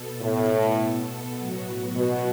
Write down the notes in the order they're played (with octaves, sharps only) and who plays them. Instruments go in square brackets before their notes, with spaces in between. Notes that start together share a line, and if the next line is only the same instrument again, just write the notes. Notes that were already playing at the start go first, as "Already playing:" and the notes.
Already playing: [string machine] B2 B3 A4
[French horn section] A2
[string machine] A2 F#3 B3 F#4
[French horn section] B2